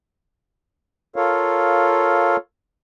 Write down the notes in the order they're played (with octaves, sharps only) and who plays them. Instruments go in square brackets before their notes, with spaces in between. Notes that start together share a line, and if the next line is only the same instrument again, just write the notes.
[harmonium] F4 A4 A#4 C#5 F5